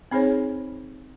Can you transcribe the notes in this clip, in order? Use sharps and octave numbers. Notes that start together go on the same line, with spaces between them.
C4 D#4 G#4 C5 C#5